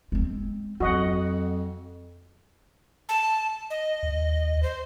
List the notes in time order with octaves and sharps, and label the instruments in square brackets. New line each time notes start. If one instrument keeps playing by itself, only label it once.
[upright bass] G#3 C4
[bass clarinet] F2 [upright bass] F#3 [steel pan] F#4 D#5 F#5
[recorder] A5
D#5
[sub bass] D#2
[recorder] C5